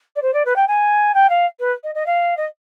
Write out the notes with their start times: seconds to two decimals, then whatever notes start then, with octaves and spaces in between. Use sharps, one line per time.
0.16 D5
0.22 C5
0.34 D5
0.45 B4
0.56 G5
0.68 G#5
1.15 G5
1.30 F5
1.60 B4
1.84 D#5
1.95 D#5
2.06 F5
2.37 D#5